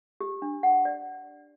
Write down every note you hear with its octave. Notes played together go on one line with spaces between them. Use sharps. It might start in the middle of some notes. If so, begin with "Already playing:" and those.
G4
D4
F#5
D5